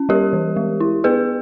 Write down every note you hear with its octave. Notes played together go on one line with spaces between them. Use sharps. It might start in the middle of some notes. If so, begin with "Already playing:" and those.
Already playing: C#4
G3 G4 A#4
E3
G#3
E4
B3 G#4 B4